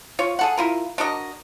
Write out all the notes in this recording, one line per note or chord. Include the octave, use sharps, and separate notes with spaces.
F4 C#5
G#4 A4 F#5
E4 F4 A#4
D4 F#4 A#4 D#5